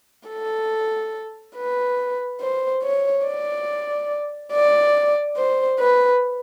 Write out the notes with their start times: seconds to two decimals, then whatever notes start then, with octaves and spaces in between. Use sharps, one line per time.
0.29 A4
1.56 B4
2.41 C5
2.83 C#5
3.26 D5
4.53 D5
5.37 C5
5.80 B4